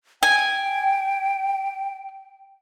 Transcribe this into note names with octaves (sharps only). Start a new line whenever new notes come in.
G5 G#5